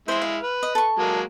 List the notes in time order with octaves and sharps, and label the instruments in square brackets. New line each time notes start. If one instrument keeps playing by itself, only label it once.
[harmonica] G#3 E4 [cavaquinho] C5 E5
[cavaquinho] F5
[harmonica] B4
[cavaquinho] D#5
A4 C#6
[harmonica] F#3 G#3 A#3